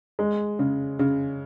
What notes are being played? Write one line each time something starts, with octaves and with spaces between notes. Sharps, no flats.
G#3
C#3
C#3